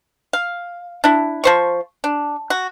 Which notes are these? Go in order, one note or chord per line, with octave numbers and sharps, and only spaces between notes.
F5
D4 E4
F3 C5 C#6
D4
F#4